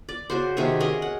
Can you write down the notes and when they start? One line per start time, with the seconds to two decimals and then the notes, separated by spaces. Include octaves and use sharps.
0.09 D5
0.30 C#3 F#4 C5
0.57 C3 D#3 C#4 G#4
0.80 C#4 G#4 A#4 D#5
1.02 F#5